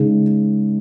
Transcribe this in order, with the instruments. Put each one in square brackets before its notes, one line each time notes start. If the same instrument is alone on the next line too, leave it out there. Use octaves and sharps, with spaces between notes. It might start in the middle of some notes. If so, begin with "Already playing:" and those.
Already playing: [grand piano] C#3 G#3 D#4